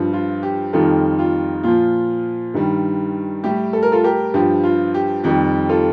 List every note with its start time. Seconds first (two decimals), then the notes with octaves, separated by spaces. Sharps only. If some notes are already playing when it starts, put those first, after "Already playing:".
Already playing: G2 F3
0.13 F4
0.43 G4
0.73 F2 D#3 G3 F4 A4
1.19 F4
1.63 A#2 F3 F4
2.54 G2 D#3 G3
3.44 A2 G3 G4
3.73 A4
3.83 A#4
3.92 F4 A4
4.04 G4 A#4
4.34 G2 F3 G4
4.64 F4
4.94 G4
5.24 F2 D#3 G3 G4
5.69 F4 A4